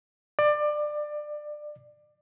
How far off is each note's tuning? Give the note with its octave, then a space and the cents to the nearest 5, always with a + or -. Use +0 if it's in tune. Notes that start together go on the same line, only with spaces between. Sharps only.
D5 +25